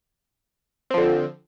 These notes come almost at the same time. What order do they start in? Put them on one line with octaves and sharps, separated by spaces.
C4 F3 D3